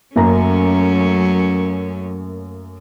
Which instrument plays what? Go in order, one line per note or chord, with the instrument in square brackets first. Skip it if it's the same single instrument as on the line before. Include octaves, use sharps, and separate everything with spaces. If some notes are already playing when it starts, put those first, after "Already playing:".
[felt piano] F#2 A#3 A#5 [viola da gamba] F#3 A3 C#4